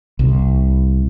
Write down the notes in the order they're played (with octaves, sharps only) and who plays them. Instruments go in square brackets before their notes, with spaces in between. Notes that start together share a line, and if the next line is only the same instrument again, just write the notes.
[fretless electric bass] C2